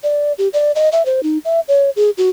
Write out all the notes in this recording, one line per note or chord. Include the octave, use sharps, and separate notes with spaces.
D5
G4
D5
D#5
E5
C5
D#4
E5
C#5
G#4
F#4